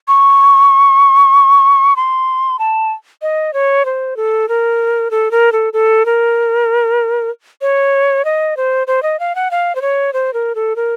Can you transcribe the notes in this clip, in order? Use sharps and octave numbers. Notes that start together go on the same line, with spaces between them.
C#6
C6
A5
D#5
C#5
C5
A4
A#4
A4
A#4
A4
A4
A#4
C#5
D#5
C5
C5
D#5
F5
F#5
F5
C5
C#5
C5
A#4
A4
A#4